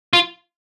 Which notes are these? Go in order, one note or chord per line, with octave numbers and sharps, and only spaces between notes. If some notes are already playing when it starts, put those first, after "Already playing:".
F4